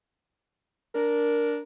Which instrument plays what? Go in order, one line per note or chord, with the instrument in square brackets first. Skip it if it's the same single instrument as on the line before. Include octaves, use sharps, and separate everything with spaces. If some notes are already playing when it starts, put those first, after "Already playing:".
[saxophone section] D4 A#4